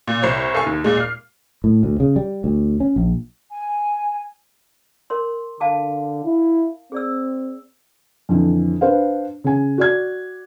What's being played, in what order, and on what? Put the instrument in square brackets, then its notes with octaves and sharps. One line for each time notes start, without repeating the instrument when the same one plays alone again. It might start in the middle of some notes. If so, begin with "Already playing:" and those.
[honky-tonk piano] A#2
C2 C5 C#5
A4 F5 G#5 C#6
D#2
A#2 G#3
F6 C7
[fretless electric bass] A2
D2
C#3
G3
D2
C#4
A#1
[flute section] G#5
[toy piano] A#4 C#5 C6
[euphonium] D3 [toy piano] F5 A5 D6
[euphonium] E4
[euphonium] C4 [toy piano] G#4 D5 E6
[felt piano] F2 D3 E3
D4 B4 C5 F5
C#3 G#5
F#4 D5 G#6